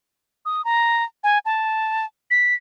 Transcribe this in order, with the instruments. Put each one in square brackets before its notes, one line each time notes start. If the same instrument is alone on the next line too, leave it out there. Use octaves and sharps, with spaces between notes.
[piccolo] D#6
A#5
G#5
A5
B6